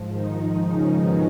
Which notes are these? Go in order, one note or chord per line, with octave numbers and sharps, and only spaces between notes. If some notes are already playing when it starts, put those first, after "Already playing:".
Already playing: G#2 F3
D#3 D#4
C#3 C#4
B2 B3